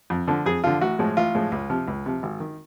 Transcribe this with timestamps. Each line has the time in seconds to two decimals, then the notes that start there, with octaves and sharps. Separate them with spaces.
0.10 F2
0.28 D3 F3
0.46 F2 G#4
0.64 D3 F3 F4
0.81 A1 F#4
0.99 A2 F3 G#3
1.17 A1 F4
1.35 A2 F3 G#3
1.52 C#2
1.70 C3 F3
1.88 C#2
2.06 C3 F3
2.23 G#1
2.40 D#3